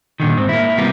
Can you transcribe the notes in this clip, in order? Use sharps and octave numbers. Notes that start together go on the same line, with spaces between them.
A#2 D3 D#3
G#2 C4
A#3 E4
C3 G3 A#3 B3